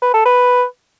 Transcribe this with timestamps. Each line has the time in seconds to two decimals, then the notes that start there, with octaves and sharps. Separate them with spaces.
0.02 B4
0.14 A4
0.25 B4